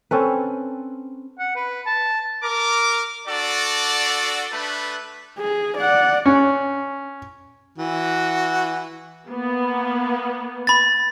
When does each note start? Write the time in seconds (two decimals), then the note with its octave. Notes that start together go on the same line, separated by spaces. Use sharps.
0.11 C4 C#4 A4 B4
1.39 F#5
1.55 B4
1.86 A5
2.43 A#4 D6
3.27 D4 F#4 A4 D5
4.52 A3 D4 B4
5.39 G#4
5.77 D5 F#5
6.26 C#4
7.78 E3 F#4
9.28 A#3 B3
10.67 B5 A6